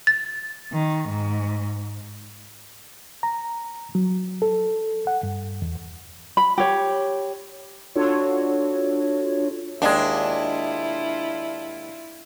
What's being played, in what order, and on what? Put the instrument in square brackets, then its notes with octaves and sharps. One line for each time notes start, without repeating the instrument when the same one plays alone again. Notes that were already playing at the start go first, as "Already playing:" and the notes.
[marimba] A6
[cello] D#3
G#2
[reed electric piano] A#5
F#3
A4
F#5
G2
E2
[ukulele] B5
G4 C#5
[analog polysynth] D4 F4 F#4 A4 C#5
[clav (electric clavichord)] D#2 G#3 [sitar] D4 [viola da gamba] E4 F4